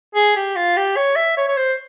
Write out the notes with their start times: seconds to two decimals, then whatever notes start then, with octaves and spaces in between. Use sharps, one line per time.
0.15 G#4
0.36 G4
0.56 F4
0.76 G4
0.96 C#5
1.16 E5
1.37 C#5
1.48 C#5
1.57 C5